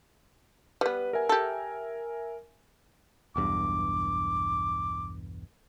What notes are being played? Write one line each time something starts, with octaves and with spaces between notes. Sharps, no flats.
G3 B3 B4
A#4 E5 G#5
G4 A4
B1 E2 G2 D6